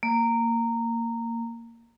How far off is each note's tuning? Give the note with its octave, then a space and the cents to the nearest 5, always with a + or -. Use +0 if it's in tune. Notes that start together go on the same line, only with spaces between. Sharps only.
A#3 -15